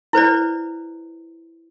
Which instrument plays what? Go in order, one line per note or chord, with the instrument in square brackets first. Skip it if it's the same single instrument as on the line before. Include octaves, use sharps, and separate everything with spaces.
[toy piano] E4 B4 C5 D5